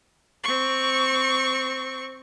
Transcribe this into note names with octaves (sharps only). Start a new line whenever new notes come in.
C4 C#6